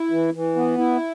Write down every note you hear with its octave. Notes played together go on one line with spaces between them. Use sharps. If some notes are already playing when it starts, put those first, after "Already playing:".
Already playing: E4
E3
E3
B3
E4